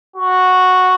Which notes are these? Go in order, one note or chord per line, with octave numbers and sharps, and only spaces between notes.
F#4